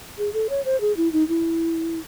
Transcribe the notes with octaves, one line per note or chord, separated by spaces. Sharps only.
G#4
A4
C#5
C5
G#4
E4
D#4
E4